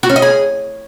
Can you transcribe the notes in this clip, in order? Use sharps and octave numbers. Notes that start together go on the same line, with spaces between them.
F#4
C#4
D#5
G#4